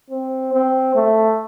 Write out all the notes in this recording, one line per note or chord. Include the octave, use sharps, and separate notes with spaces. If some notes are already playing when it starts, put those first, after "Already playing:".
C4
C4
A3